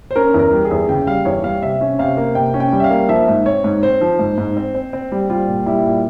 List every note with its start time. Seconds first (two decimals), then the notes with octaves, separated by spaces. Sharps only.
0.11 C5
0.16 C#4 A#4
0.34 E2 A#4
0.52 G3
0.65 G#4
0.71 E2
0.89 C#3 G5
1.07 G3 F5
1.25 E2 C#5
1.43 G3 F5
1.62 C3 E5
1.81 C#4
1.99 C3 F5
2.17 A#3
2.35 C3 G5
2.54 C#4
2.60 G5
2.72 G3
2.80 E5
2.84 F5
2.90 A#3
3.09 F3 E5
3.28 G#2
3.45 C4 C#5
3.64 G#2
3.83 C4 C5
4.01 F3
4.19 G#2
4.38 G#2
4.57 C4
4.75 C4
4.93 C4
5.12 G3
5.30 G3 F4
5.48 A#2
5.66 G3 E4
5.85 A#2